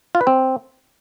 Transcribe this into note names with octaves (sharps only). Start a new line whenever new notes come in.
F4
B4
C4